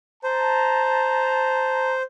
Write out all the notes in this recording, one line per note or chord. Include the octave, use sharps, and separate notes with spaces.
C5 A5 A#5